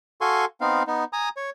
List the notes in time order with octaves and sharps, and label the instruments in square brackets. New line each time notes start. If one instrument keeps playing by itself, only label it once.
[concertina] F#4 A4 F5 G#5 C6 C#6
B3 C4 D#4 F5
B3 D#4
G#5 A#5 D#6
C#5